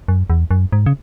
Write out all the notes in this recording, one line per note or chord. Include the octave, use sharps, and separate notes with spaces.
F#2
E2
F#2
G#2
C#3